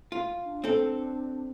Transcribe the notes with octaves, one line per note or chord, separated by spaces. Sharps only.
F4
D4
C4 A4